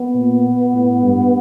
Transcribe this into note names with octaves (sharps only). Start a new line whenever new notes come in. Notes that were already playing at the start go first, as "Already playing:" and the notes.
Already playing: B3
A#2
A2
G2